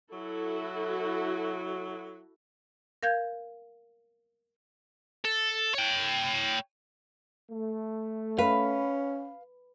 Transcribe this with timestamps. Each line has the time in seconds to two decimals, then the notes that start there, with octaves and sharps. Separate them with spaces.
0.12 F#3 E4 F#4 A4
3.03 A#4 F5 G6 G#6
5.25 A4
5.74 C#5 G5
7.52 A3
8.38 C#4 B4 F5